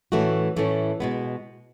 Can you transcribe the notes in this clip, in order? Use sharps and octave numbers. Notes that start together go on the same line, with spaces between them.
A2 E3 A3 C#4 F#4
A2 E3 A3 C#4
B2 G#3 B3